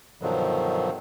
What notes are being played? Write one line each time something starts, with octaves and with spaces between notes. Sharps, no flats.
G2 B2 D3 D#3 F3 F#3